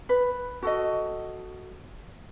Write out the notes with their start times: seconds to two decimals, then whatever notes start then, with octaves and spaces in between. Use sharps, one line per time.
0.09 B4
0.63 F#4 A4 D#5